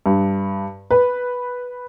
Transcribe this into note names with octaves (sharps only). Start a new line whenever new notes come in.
G2
B4